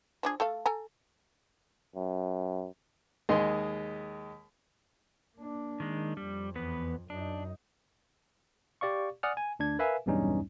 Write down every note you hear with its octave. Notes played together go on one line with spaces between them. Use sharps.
F3 D4 G#4
A3 A4 F5
A4 G#5 A#5
F#2
D#2 G#3 D#5 C6
A#3 D4
D#3 G#3
F2 G3
E2 B3 B4
F#2 D4 D#4
G4 D5 F5 C#6
D5 F#5 G#5 D#6 F6
G#5
D2 D4 G#6
A#4 B4 E5 F5 G#5
B1 E2 G2 G3 C#4 D#4